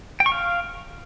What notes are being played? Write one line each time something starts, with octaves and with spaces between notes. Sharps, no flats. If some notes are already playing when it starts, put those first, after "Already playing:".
G5
C#6
F5